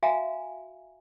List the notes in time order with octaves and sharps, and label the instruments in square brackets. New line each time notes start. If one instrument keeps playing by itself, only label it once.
[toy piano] F#4 E5 F5 G#5 A#5